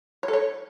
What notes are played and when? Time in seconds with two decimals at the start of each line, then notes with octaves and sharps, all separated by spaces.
0.23 C#5
0.28 A4
0.33 C#5